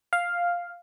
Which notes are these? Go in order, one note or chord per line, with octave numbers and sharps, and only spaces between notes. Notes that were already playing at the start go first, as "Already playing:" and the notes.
F5